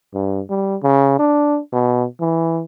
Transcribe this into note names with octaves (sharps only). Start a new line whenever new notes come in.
G2
G3
C#3
D4
B2
E3